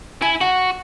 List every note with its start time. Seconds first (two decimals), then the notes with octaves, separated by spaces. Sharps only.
0.22 E4 G#5
0.41 F#4 F#5